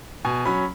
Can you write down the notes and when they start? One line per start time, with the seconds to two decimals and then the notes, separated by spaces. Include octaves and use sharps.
0.25 B2 G#5
0.45 F#3 C#4 B5